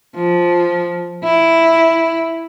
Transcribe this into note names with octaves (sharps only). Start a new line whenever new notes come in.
F3
E4